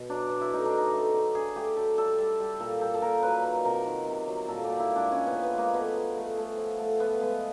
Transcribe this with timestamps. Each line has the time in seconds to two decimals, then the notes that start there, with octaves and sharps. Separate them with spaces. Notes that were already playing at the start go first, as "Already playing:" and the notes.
Already playing: B2
0.09 F#3 D4
0.30 B2
0.41 E4
0.52 A3 D#4
0.65 D4
0.72 D3
0.78 D#4
0.93 A3
1.14 D3
1.35 D3 G#4
1.56 A3 G4
1.77 F#3 A4
1.97 G3 A4
2.18 G3
2.40 G3
2.60 A#2 A4
2.81 G3 A4
2.94 A4
3.02 A#2 A#4
3.23 F#3 B4
3.44 D#3 A#4
3.65 C3 A#4
3.86 D#3
4.07 C3
4.28 F#3
4.48 A#2 A4
4.64 G4
4.69 A#2
4.80 E4
4.91 G#3 D4
5.11 A#2 C#4
5.27 B3
5.32 F3
5.43 B3
5.54 G#3 A#3
5.74 A3 B3
5.95 F3
6.17 A3
6.37 A3
6.57 F3
6.79 A3
7.00 F3 B3
7.20 G#3 B3